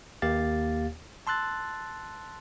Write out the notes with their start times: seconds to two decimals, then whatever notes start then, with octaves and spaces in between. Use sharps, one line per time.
0.22 D#2 A#3 G4 F5 A6
1.27 A5 C6 E6 F#6 A6